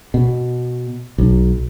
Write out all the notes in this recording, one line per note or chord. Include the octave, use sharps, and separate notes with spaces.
B2
B1